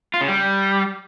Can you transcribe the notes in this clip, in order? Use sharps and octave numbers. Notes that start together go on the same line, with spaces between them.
F4
C#3
G3